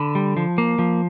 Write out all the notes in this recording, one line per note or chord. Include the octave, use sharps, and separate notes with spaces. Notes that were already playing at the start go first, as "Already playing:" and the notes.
Already playing: D3 A5 B5
G3
F3
A#3
F3